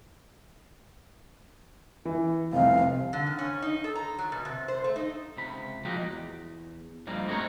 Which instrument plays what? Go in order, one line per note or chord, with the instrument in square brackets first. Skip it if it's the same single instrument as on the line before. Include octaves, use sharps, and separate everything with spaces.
[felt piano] E3
[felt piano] F1 C2 [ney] F5
[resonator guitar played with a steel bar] D3
D#3
C#4
D#4
A4
A#5
F#3
B2
C3
C5
A3
D#4
[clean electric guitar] C#2 C3 B5
F3 G#3 A#3 D#4 F#4 G4
E2
G2 F3 G3 G#3 A#3
A3 C4 D#4 F#4 A#4 C#5